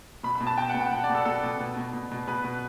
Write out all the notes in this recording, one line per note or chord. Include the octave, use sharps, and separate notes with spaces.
B2 B5
B5
B2
A5
B2 G5
F#5
B2
G5
B2 F#5
D5
B2
A4
B2 A4
B2
B2
B2
B2
B2
B2 B4
B2